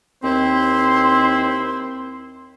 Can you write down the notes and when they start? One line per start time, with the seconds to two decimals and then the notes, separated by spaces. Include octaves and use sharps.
0.23 D#2 C4 E4 C5 C6